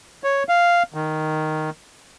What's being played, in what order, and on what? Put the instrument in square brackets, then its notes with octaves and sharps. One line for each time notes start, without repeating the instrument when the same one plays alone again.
[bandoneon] C#5
F5
D#3